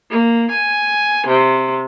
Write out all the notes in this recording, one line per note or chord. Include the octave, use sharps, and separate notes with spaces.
A#3
G#5
C3